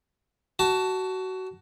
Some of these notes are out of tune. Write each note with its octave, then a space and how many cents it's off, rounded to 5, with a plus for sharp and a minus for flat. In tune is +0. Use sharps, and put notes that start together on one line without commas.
F#4 +20 A5 +0